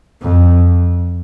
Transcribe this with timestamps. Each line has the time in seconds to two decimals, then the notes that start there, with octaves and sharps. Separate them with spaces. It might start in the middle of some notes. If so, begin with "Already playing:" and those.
0.22 F2